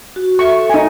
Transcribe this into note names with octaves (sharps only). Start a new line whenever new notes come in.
F#4
A4 E5 C#6
D#4 G#5